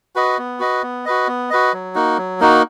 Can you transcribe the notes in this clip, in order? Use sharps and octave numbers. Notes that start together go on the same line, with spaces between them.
F#4 B4 D#5
B3
F#4 B4 D#5
B3
F#4 B4 D#5
B3
F#4 B4 D#5
F#3
A#3 D#4 F#4
F#3
A#3 D#4 F#4